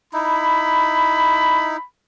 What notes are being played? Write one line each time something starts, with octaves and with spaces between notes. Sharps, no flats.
D#4 E4 B5